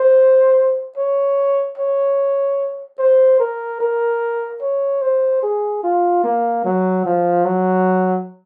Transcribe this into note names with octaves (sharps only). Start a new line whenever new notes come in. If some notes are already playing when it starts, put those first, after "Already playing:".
Already playing: C5
C#5
C#5
C5
A#4
A#4
C#5
C5
G#4
F4
A#3
F#3
F3
F#3